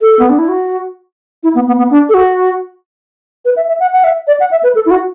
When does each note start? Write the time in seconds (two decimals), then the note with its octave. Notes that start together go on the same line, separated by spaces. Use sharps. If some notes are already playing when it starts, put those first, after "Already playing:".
0.01 A4
0.19 B3
0.30 D4
0.39 E4
0.49 F#4
1.43 E4
1.55 B3
1.67 B3
1.78 B3
1.91 D4
2.09 A4
2.14 F#4
3.45 B4
3.57 E5
3.68 E5
3.80 F#5
3.93 F#5
4.04 E5
4.27 D5
4.40 F#5
4.51 E5
4.63 B4
4.75 A4
4.86 E4
4.91 F#4